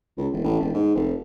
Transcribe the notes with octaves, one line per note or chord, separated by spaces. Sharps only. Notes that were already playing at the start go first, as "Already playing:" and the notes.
C#2
E1
A1
E1
G#2
F1